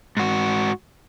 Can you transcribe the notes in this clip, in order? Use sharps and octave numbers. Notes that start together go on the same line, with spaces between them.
G#2 F#4